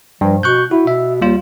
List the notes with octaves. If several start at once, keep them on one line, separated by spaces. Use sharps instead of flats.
G2 F3
B2 C#6 F#6 G6
E4 F#4
B2 E5
D#2 G3 F4